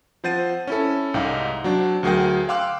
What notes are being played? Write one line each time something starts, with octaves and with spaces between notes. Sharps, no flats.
F3 C4 C5 F#5 A6 D#7
C#4 E4 A4
C2 G#2 D#4 F5 G5
F#3 C4 D4
D2 F#3 G#4 A#4 G5
F5 G5 C6 D6 E6 F#6